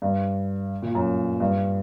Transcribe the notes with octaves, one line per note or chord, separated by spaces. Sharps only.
G2
A#2
F#2
G2